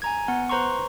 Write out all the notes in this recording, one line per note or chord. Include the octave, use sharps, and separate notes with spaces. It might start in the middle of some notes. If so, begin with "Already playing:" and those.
G#5 A#5 G#6
B3 F#5
B4 C5 A#5 C6 C#6